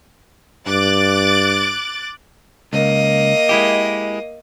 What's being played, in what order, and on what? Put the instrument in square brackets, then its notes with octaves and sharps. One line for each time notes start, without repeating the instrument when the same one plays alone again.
[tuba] G2 [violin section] D6 F#6 A6
[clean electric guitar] C#2 [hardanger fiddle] A#3 D#5
[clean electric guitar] G#3 E4 G4